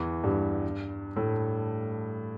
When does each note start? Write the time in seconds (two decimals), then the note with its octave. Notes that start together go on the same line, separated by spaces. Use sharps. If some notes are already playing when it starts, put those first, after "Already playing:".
Already playing: E2 E3
0.24 G2 G3
1.16 A2 A3